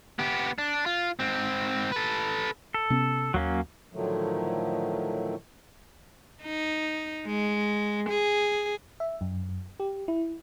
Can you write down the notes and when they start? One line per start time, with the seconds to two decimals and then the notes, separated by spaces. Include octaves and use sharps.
0.19 B3 G4
0.58 D4
0.86 F4
1.19 G#2 C4
1.92 A4 B4
2.74 A4
2.90 C3 B3 C#4
3.34 D#2 F#3 A#3 C#4
3.93 A2 D3 D#3 F3 F#3 A3
6.42 D#4
7.26 G#3
8.10 G#4
9.00 E5
9.21 F#2
9.80 G4
10.08 E4